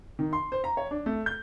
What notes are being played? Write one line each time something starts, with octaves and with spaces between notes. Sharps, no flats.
D#3
C6
C5
A#5
C#5
D4
A3
G6